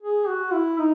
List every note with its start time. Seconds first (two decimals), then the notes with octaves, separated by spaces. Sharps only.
0.02 G#4
0.28 F#4
0.53 E4
0.79 D#4